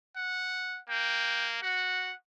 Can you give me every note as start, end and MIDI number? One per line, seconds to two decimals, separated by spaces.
0.16 0.80 78
0.89 1.58 58
0.89 1.46 79
1.62 2.11 66
1.62 2.15 78